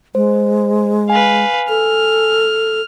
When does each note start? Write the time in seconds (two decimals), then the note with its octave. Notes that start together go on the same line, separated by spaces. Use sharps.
0.15 G#3 C5
1.10 B4 F5 G#5
1.69 A4 F6